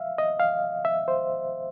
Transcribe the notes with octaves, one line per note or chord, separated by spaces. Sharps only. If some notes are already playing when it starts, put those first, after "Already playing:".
Already playing: E5 F5
D#5
F5
E5
C5